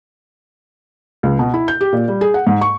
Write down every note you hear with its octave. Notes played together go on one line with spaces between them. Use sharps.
C#2
B2
E4
G6
G4
A#2
G3
G#4
F#5
G#2
C#6